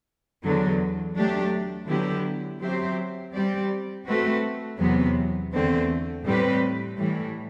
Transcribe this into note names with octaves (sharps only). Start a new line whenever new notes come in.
E2 D3 F#3
F#3 A3 D4 G4
D3 F#3 B3 E4 G4
F#3 C4 G4 C5 E5
G3 C4 G4 D5
A3 C4 F#4 B4
E2 C3 F#3 B3
E2 D3 A3 C4
A2 G3 C4 G4 B4
A2 E3 G3